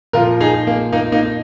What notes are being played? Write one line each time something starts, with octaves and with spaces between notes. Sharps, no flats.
A#2 F3 F4 A#4
D#4 G#4
A#3
A#3 D#4
A#3 D#4